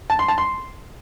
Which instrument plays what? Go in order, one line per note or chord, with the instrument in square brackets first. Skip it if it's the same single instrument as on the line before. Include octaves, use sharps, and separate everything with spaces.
[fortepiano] A5
C6
A5
C6